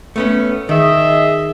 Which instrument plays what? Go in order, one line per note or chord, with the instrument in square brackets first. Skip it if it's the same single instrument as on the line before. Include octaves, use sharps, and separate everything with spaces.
[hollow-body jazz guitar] A3 B3 C#4
[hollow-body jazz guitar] D#3 [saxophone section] G#4 D#5 E5